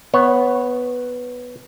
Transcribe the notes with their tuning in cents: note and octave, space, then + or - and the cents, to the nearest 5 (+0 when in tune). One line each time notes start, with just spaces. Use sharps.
B3 +0 C#5 -15